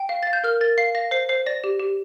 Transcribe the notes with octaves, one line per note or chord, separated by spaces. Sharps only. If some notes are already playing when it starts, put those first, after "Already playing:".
Already playing: G5
F5
F5 A6
G6
A#4 F6
A#4 A6
F5 C7
F5 A#6
C5 C7
C5 C7
D5 A#6
G4
G4